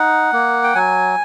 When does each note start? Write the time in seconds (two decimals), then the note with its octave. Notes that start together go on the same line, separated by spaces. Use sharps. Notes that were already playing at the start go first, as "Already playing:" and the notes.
Already playing: D#4 F#5
0.33 A#3
0.64 G5
0.75 F#3 G#5